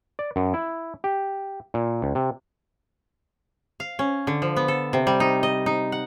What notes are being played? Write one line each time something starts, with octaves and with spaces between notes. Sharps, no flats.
D5
F#2
E4
G4
A#2
C#2
C3
F5
C#4
D3
F3
B3
A4
C3
G3
D#4
D#5
D#4
F#5